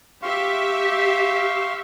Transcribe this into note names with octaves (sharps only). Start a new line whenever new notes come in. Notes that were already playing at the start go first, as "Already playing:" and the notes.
G4 E5 F5 C6 C#6